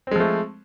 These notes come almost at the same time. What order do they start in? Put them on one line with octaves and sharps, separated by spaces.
C4 G#3 F3 A3